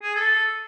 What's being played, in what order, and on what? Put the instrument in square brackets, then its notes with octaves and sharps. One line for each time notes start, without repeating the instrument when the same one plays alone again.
[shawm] G#4
A4